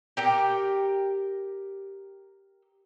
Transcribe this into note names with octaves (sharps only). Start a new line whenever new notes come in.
G4 A#4 G5